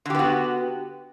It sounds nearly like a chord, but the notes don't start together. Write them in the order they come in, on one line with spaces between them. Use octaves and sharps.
D3 G4 B3 F#4